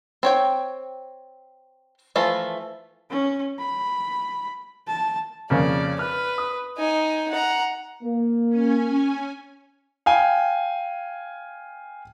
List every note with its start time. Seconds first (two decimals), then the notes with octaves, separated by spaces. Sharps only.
0.23 C4 C#5 G5
2.16 E3 F3 A3 F4
3.10 C#4
3.59 B5
4.87 A5
5.50 F2 C#3 A#3 D5
5.99 B4 F6 F#6
6.38 D#6
6.78 D#4 G#5
7.31 F#5 A#5
8.03 A#3
8.49 C#4 G#5
10.06 F5 G5 G#5